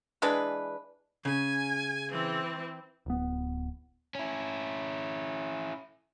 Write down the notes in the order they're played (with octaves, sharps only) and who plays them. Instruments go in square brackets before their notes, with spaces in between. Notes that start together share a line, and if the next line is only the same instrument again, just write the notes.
[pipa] E3 G#3 D4 B4
[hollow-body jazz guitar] C#3 [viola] G#5
[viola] E3 C4
[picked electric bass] D1 B3
[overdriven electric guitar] C#4 E4